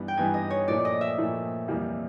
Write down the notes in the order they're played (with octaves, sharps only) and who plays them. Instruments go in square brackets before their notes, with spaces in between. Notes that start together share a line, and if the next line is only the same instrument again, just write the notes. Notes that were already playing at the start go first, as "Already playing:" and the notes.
Already playing: [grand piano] G2 E3 G3 B3 D#4
[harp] G5
[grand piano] G2 E3 G3 B3 D#4 [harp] G#5
[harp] D#5
C#5
[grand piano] A#2 F3 A3 [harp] D5
[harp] D#5
E5
[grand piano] A#2 F3 A3
F2 C3 E3 G3 A#3